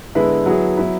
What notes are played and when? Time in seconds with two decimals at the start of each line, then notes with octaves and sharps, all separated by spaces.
0.15 D3 G#3 B3 E4 B4
0.46 F#3 B3 E4 G#4
0.77 F#3 B3 E4 B4